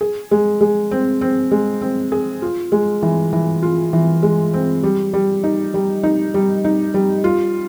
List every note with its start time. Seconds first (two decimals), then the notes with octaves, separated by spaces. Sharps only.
0.01 G#4
0.31 G#3
0.61 G#3
0.91 C4
1.21 C4
1.51 G#3
1.81 C4
2.12 G#4
2.42 F4
2.72 G#3
3.03 E3
3.33 E3
3.63 F4
3.93 E3
4.23 G#3
4.53 C4
4.83 G3
5.13 G3
5.43 D#4
5.74 G3
6.03 D#4
6.34 G3
6.65 D#4
6.94 G3
7.24 F4